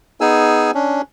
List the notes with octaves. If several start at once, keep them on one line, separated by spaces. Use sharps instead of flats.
B3 D#4 G#4 G#5 E6
C#4 D4